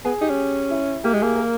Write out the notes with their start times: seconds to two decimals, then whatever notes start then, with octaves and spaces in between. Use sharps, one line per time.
0.05 B3 G#4
0.21 D#4 G4
0.30 C#4
0.71 E4
1.04 A#3 G4
1.14 G#3
1.22 A#3 G#4
1.35 A#4